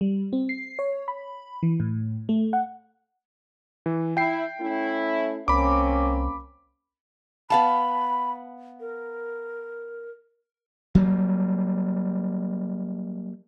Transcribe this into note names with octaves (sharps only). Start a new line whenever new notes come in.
G3
C4
C7
C#5
B5
E3
A2
A3
F#5
E3
E4 G5 C7
A3 C#4 E4
C2 A#3 C4 C#4 B5 D6
B3 F5 A5 B5
A#4
F#3 G3 A#3